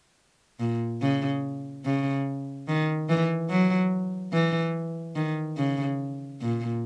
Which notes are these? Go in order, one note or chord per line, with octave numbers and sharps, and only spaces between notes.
A#2
C#3
C#3
D#3
E3
F#3
E3
D#3
C#3
A#2